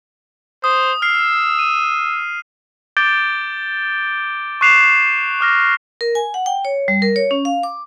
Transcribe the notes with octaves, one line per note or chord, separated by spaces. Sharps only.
C5 D#6
E6 F6 C7
D#7
D6 G6 A6 D7 G7
C#6 D6 F#6 C7 E7 F7
D6 F6 A#6
A#4
G#5
F#5
G5
C#5
G3
A#4
C#5
C#4
F5
D6